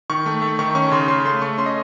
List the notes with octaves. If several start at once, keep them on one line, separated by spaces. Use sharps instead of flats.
D#3 C#6
A3
A3
D#3 C#6
C#4 C#6
C#3 C6
C#3 C6
A3 C6
A3 C#6
C#4 C6
D#5